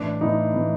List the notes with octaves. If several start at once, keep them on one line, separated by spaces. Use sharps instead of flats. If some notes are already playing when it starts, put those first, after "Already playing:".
Already playing: A2 E3 D4
A2 E3 D#4
A2 E3